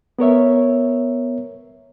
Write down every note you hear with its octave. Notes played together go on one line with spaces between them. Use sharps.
B3 A#4 C#5 E5